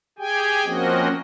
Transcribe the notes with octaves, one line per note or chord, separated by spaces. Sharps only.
G4 G#4 G5 G#5
F3 A#3 C4 C#4 F#4 D#5